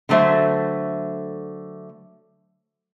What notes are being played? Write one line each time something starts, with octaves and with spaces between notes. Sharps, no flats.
D3 F#3 A3 C5 E5